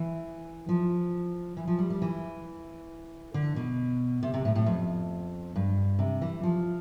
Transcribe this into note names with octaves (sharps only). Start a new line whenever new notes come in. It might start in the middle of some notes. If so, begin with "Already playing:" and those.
Already playing: E3
F3
E3
F3
G3
G3
E3
D3
B2
C3
C3
A2
A2
F2
G2
C3
E3
F3